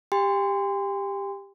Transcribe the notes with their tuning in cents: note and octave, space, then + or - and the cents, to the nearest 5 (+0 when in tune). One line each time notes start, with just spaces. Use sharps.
G4 +10 G5 +45 C6 -20